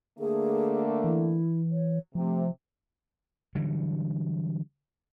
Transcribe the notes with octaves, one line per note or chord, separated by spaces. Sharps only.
D3 A3 A#3 G#4
E3 E4
C#5
C3 F3 A3
D3 E3 F#3 G3